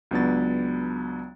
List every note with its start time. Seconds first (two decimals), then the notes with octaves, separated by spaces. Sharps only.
0.11 C#2 F#3 B3 D4 B5 A6